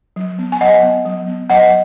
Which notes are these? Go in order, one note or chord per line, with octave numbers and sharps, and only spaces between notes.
F#3
B3
G#5
F#3 D#5 F#5
B3
F#3
B3
F#3 D#5 F#5